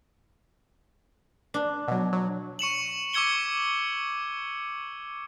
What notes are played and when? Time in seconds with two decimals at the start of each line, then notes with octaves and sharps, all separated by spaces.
1.54 D4
1.88 B2 F#3
2.13 F#3
2.59 C#6 C#7 E7 F#7
3.14 C#6 D6 E6 G#6 C#7 G7